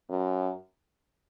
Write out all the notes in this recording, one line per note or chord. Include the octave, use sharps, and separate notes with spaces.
F#2